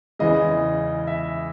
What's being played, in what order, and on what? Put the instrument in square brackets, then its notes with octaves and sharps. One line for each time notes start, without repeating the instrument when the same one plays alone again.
[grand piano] E2 C#3 E3 G#3 D#5
E5